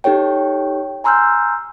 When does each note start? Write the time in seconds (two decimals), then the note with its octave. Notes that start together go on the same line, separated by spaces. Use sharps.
0.04 D#4 G4 A4 C#5 G5
1.04 G#5 A#5 C6 E6 F6 G6